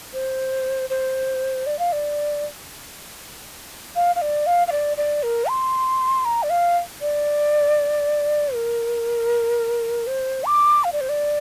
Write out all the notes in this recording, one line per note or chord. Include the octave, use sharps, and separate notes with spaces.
C5
C5
D5
F5
D5
F5
F5
D5
F5
F5
D5
D5
A#4
C6
A#5
D5
F5
D5
A#4
C5
D6
F5
D5
C5
D5